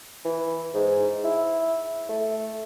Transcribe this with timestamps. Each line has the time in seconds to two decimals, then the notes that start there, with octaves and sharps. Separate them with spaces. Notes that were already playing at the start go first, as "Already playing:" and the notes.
0.25 E3
0.74 G#2
1.24 E4
2.09 A3